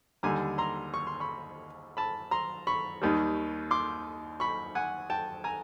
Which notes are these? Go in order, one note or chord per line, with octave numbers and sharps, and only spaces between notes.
D#2 D3 G3 G#5 A#5
A#5 C6
C#6
C6
B5 C#6
A5 B5
A#5 C6
B5 C#6
D#2 D#3 G3
C6 D6
B5 C#6
F#5 G#5
G5 A5
G#5 A#5